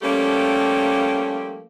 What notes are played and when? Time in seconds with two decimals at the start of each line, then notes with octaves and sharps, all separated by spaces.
0.02 F3 G3 A3 A#3 C#4 G4